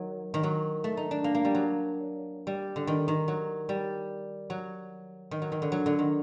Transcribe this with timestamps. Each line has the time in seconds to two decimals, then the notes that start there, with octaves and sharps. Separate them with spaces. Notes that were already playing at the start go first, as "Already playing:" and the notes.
Already playing: D#3 F#3
0.34 D#3
0.43 F#3
0.84 A3
0.97 D#4
1.11 D4
1.24 A#3
1.35 A#3
1.45 G3
1.55 F#3
2.47 G3
2.76 D3
2.87 D#3
3.08 D#3
3.28 F#3
3.69 G3
4.50 F#3
5.31 D#3
5.42 F#3
5.52 D#3
5.62 D3
5.72 F#3
5.86 D3
5.99 D#3